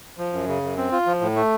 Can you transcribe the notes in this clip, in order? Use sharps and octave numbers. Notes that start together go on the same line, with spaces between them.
F3
F#2
C#3
F#2
C4
F4
F3
A2
A3